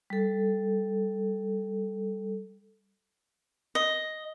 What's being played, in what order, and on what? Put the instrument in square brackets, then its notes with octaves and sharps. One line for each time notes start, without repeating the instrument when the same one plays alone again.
[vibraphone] G3 A4
[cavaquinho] D#5